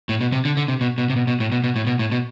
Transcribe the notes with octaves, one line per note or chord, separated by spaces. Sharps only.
A2
B2
C3
D3
D3
C3
B2
B2
C3
B2
B2
A2
B2
B2
A2
B2
A2
B2